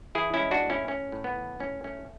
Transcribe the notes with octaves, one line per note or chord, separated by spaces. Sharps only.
E3 E4 G#4
C#4 E4
G#3
D4 F#4
A2
C#4 E4
A2 C#4
A2
B3
E3
A2 C#4
A3 C#4